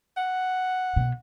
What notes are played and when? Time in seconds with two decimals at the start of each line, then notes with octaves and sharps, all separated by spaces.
0.17 F#5
0.96 B2